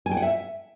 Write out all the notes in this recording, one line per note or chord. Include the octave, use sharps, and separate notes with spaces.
G#5
G5
F#5
E5